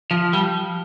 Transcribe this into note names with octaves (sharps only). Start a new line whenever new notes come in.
F3
G3